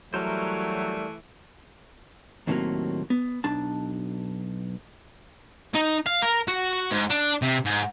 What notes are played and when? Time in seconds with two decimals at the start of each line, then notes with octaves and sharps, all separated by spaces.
0.14 E3 F#3 G3 A3 A#4 C5
2.47 D#2 A2 C3 F#3 A#3
3.10 B3
3.44 B1 D4 A5
5.75 D#4
6.06 F5
6.22 A#4
6.48 F#4
6.91 G#2
7.10 D4
7.42 C3
7.65 G#2